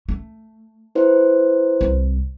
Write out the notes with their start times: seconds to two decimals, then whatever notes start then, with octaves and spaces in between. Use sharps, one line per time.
0.09 A3
0.95 E4 B4 C5
1.81 C2